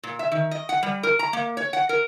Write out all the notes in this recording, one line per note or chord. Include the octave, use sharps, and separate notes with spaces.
A#2
E5
D#3
D#5
F#5
G3
A#4
A#5
A#3
C#5
F#5
A#4